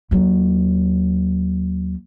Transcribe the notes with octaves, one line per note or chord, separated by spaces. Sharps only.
D#2 F#3